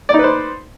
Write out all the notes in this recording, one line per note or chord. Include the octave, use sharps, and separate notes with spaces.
D#4 B4 C5 D5